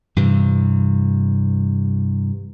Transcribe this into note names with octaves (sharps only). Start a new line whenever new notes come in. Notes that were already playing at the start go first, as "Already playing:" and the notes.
G2 C3 E3